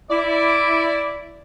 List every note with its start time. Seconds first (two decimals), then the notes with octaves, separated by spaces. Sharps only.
0.11 E4 D5